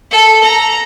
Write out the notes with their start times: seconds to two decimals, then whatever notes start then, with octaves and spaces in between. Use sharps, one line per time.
0.11 A4
0.43 A#5